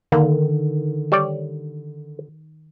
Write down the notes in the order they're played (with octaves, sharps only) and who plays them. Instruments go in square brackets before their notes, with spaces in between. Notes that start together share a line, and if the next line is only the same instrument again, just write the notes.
[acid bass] D3 [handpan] D#3 [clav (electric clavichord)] A#3
[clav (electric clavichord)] G3 C#5 D5